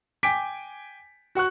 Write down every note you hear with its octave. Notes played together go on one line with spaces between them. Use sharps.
G5 G#5 D6 B6 D7
F#4 F#5 C#6 F#6